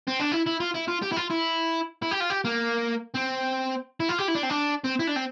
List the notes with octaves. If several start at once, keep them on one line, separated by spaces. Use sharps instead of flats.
C4
D4
E4
E4
F4
E4
F4
G4
E4
F4
E4
E4
G4
F4
G4
A#3
C4
E4
F4
G4
E4
D4
C4
D4
C4
E4
D4
C4